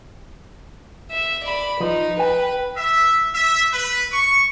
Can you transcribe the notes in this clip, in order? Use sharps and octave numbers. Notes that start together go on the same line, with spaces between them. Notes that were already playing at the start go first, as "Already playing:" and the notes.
E5
D5 B5
F3 D#4 B4
B4 G5
E5
E5
B4
C#6